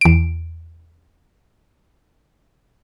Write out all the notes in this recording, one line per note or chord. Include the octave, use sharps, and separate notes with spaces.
E2 D7